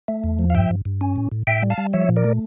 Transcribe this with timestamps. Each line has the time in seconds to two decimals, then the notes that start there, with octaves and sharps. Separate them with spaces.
0.08 A3
0.24 E2
0.39 F3
0.50 F5
0.55 G2 E5 G5
0.70 G2
0.85 G2
1.01 C#4
1.16 A2
1.32 A2
1.47 A2 E5 G5
1.63 G3
1.70 F5 A5
1.78 G3
1.93 F3 C#5 E5
2.09 A#2
2.16 A#4 D5
2.24 A3